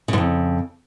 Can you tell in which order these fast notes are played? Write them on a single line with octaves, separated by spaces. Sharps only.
C#3 G#2 F2